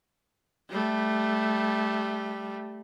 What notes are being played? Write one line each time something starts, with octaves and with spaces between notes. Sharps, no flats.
G3 A3